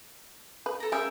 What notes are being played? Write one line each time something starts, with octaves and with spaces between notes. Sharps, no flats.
B4
A4 A#5
G#3 C#4 A#4 E5 G5